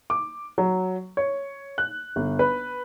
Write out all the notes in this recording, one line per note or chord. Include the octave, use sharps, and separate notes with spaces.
D6
F#3
C#5
F#6
G1
B4